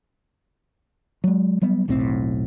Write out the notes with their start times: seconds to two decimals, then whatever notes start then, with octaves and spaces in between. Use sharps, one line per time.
1.24 F#3 G#3
1.62 F#3 G3 B3
1.88 E1 B1 A2 C4